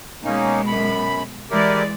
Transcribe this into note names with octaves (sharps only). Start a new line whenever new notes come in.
B2 G#3 A#3 C#4 D#4
F#2 B5
E3 G#3 E4 G4 A#4 D5